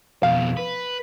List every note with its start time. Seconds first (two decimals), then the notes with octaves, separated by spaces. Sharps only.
0.23 F2 B2 F5
0.57 B4